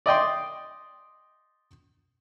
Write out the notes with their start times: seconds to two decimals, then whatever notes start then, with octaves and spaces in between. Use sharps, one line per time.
0.06 D5 D#5 G5 C6